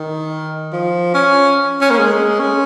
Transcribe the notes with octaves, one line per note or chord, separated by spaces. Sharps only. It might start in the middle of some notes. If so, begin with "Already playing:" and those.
Already playing: D#3
F3
C#4
C#4
A#3
G#3
C#4